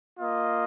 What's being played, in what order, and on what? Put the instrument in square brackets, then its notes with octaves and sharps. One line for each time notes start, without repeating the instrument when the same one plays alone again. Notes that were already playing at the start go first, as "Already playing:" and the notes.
[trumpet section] A#3 F4 D#5